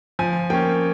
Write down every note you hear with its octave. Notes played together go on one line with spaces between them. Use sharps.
F3 G#5
A#3 C#4 G5